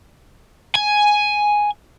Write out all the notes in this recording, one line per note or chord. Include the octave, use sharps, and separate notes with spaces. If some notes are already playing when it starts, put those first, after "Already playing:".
G#5